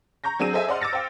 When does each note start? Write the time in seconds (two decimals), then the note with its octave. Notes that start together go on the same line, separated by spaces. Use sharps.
0.24 A#5 C#6 G6 A#6
0.39 F#3 C4 D4 G#4 E6 D#7
0.53 G#4 A4 C5 D#5 E5 G#5
0.68 C5 D5 D#5 F#5 C6 F6
0.81 D6 E6 A6 A#6 C#7
0.93 C5 F5 G5